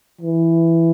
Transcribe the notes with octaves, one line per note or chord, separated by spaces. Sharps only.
E3